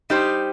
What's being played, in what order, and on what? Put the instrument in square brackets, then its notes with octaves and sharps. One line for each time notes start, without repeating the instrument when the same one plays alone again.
[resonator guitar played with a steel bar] G3 D#4 G4 C5